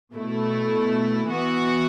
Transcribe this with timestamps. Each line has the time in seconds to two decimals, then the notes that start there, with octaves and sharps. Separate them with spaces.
0.13 B2 A3 E4
1.29 E3 B3 F#4